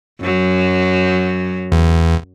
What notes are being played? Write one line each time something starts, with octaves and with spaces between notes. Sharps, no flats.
F#2 F#3
E2